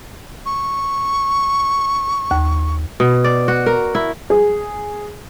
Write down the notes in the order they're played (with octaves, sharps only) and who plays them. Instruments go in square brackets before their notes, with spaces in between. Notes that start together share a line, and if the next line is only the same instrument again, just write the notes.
[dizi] C#6
[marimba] D#2
[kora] B2
D5
F#4
A#4
E4
[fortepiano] G#4